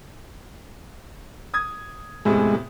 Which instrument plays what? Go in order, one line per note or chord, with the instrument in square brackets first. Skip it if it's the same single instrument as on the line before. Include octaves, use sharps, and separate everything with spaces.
[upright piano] D#6 G#6
[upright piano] E2 A2 C3 [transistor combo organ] G#3